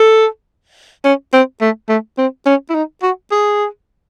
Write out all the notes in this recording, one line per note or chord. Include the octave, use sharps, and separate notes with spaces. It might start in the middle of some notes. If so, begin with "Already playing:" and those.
Already playing: A4
C#4
C4
A3
A3
C4
C#4
E4
D#4
F#4
G#4